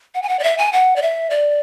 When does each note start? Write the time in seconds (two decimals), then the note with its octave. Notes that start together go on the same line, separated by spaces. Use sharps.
0.15 F#5
0.22 G#5
0.29 F#5
0.39 D5
0.44 E5
0.58 G#5
0.73 F#5
0.96 D5
1.02 E5
1.30 D5